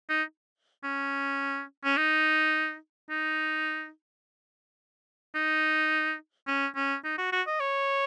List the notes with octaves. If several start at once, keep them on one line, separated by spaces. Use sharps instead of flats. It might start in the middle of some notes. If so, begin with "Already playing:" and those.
D#4
C#4
C#4
D#4
D#4
D#4
C#4
C#4
D#4
F#4
F#4
D#5
C#5